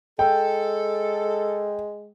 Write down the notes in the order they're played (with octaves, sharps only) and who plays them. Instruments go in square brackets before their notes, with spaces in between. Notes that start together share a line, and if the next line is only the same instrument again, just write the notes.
[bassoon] G#3 [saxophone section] A4 [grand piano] G5